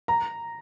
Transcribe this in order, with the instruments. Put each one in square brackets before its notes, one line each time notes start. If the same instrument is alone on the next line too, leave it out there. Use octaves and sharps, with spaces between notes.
[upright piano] A#5